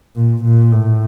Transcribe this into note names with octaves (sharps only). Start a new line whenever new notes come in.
A#2
A#2
A2